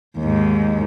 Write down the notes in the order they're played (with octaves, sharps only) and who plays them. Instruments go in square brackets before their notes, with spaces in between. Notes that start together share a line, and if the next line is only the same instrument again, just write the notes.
[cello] D#2 G#2